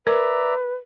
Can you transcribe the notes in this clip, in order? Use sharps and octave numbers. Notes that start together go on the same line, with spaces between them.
A#4 B4 D5 E5 A#5